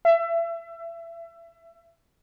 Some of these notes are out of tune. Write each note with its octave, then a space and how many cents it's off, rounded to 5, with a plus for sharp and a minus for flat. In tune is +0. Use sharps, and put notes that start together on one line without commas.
E5 +30